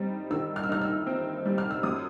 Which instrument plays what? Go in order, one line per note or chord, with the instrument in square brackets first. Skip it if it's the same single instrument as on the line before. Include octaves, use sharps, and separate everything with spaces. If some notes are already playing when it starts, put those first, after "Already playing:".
Already playing: [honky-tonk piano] G3 C4 D#4
D#3 E6
F6
E6
D#4 F6
E6
C4
G3
F6
E6
F#2 D#6